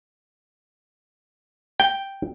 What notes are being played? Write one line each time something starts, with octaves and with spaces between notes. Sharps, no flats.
G5